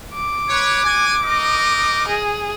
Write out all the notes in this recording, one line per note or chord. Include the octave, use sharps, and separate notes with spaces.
D6
B4 C#5
F#4 G#5
D#4 A#4 D#5
G#4